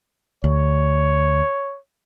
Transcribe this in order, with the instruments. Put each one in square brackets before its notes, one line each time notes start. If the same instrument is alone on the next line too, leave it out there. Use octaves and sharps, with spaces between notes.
[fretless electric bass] D2 [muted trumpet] C#5